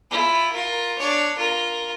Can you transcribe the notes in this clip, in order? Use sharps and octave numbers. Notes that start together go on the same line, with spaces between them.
E4 F4
F4 A#4
D4 C#5
F4 A#4